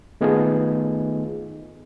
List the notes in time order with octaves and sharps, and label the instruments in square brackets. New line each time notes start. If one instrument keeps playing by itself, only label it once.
[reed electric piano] D#3 A3 B3 D#4 F4 G#4